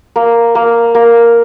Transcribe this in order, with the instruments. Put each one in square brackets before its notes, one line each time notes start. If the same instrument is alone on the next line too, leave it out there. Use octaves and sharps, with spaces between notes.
[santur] A#3
A#3
A#3